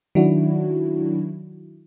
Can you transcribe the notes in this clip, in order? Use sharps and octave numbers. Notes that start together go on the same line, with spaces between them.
D#3 F#3 D4 E4 F#4